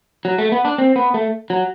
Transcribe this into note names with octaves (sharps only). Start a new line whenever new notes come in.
F#3
A3
B3
D4
C4
B3
A3
F#3